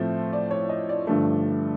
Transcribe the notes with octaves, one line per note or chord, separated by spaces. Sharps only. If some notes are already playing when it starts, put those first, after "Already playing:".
Already playing: A2 F3 A3 C4
D5
C#5
D#5
D5
G2 D3 F3 A3